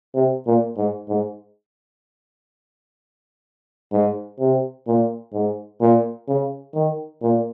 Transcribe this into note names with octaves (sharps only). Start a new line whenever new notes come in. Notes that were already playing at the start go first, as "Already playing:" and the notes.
C3
A#2
G#2
G#2
G#2
C3
A#2
G#2
A#2
C#3
D#3
A#2